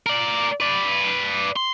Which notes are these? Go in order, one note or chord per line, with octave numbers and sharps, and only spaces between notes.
A#4 D5
B4 D5
C6